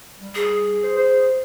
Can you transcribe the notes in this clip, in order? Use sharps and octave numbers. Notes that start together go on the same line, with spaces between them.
G3
G#4
C5
C5